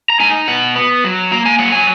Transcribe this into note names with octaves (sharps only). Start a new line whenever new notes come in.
A#5
D#4 G#5
B2 F#5
B3
F#3
A#3 A#5
G#5
F#3 F#5
G#5